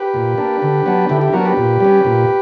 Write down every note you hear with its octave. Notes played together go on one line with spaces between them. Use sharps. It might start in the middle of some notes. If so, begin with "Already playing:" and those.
Already playing: G4 B4
A#2
A#3 D4
D3
F#3 B3 D4
D3 E4 G4
E4 G4
F#3 B3 D4 F#4 A#4
G4 B4
A#2
G3 C#4
A#2